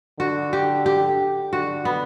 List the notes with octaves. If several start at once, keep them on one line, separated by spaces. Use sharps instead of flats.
D3 F#4
G4
G4
D3 F#4
B3